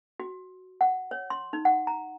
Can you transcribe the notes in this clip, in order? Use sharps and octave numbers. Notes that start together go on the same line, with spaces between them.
F#4
F#5
C#5
C6
D#4
F#5
A#5